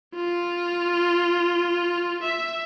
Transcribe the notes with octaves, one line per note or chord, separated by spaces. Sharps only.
F4
E5